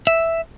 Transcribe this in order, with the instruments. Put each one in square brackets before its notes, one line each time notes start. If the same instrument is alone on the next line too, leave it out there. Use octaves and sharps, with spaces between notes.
[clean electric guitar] E5